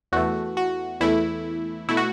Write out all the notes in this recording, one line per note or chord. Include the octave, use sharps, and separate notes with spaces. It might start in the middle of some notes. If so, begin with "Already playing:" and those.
E2 E3 A3 F#4
F#4
E2 E3 A3 E4
B2 A3 E4
F#4